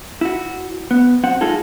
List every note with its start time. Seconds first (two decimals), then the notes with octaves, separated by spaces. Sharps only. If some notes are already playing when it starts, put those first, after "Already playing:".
0.21 E4 F#4
0.91 B3
1.23 F#2 C4 F#5
1.41 B1 G#3 D#4 F4 G#4 A4